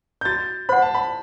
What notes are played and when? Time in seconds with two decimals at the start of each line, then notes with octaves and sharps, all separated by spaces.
0.21 G6
0.25 F#4 A6
0.69 C5 F#5 B5
0.82 A5
0.95 B5